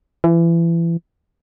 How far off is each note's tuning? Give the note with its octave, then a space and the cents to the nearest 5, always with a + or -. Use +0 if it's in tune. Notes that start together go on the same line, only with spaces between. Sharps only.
E3 +30